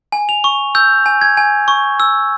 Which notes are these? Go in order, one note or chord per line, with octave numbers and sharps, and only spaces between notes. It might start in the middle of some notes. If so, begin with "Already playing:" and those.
G#5
F7
C#6
E6 G6
G#5
G#6
G#5
C#6
E6